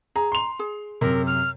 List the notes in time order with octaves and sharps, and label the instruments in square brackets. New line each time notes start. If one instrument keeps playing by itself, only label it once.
[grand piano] G#4 [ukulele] A#5
[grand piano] C6 F7
[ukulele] G#4
[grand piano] F#2 C3 [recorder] A#4
[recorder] F6